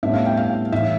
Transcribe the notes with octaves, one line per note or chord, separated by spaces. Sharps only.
A2 G3 B3 D4 E5
F5
G5
F5
A2 E3 A3 E5